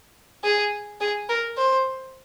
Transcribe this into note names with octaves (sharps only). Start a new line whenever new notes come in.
G#4
G#4
A#4
C5